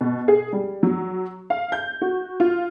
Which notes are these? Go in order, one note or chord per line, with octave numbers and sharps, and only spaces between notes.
B2
G#4
G3
F#3
F5
G6
F#4
F4